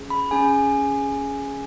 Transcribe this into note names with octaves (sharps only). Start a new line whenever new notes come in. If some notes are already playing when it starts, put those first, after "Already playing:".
Already playing: C#4 G#4
B5
C#4 G#4 G#5